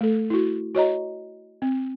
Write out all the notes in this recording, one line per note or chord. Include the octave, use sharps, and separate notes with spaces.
A3 A4
E4 F#4
F#4 C#5 D#5 A#5
C4